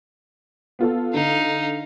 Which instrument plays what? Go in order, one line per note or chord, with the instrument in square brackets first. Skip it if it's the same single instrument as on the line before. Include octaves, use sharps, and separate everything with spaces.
[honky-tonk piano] B3 F4 A4
[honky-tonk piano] D3 [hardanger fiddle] D#4 F5